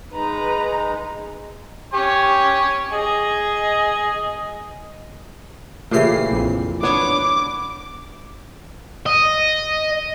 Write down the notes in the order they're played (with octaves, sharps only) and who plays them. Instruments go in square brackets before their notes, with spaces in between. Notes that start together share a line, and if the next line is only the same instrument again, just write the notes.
[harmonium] G#3 D#4 [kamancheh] B4 A#5
[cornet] G4 [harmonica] C#5 G#5
[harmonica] G#4 [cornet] D#5
[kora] A#2 C#3 E3 [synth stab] A3 G4 C7
[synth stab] A#1 F2
[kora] B3 [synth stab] D4 C#5 [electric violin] D6
[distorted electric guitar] D#5